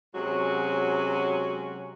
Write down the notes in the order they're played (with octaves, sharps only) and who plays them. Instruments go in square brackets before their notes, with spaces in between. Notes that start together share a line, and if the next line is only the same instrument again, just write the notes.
[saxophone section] C3 F#3 G#3 C#4 F#4